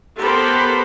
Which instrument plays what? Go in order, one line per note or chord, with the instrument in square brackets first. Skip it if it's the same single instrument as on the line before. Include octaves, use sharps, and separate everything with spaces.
[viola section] B3 G4 A4 A#4 C5 B5